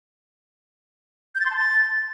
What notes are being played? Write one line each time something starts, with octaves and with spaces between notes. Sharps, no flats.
G6
A6
C6
A5
A6